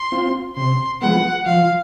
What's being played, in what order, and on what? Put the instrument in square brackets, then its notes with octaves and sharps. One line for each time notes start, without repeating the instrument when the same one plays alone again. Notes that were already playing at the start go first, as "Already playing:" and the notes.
Already playing: [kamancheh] C6
[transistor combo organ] C4 F4
[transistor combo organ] C3 [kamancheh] C6
[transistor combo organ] F3 G#3 B3 [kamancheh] F#5
[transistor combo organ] F3 [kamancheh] F5